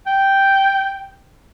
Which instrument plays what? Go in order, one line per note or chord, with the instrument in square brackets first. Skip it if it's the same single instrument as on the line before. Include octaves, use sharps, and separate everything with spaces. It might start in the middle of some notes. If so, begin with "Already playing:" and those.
[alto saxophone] G5